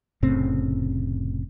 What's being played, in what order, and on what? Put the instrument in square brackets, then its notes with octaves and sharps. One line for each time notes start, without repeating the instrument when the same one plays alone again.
[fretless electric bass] F1 A2 C#3 C4